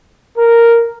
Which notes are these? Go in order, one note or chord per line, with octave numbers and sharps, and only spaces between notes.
A#4